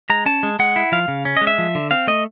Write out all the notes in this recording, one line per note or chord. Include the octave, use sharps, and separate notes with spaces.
G#3 A#5
C#4 A5
G#3
G#3 F#5
E4
F3 F5
C#3
C#4
G#3 D#5
E5
F3
D3
C4 F5
A3 D#5